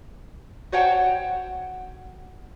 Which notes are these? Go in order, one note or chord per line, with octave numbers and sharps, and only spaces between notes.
F#4 C5 C#5 F#5 G5 A5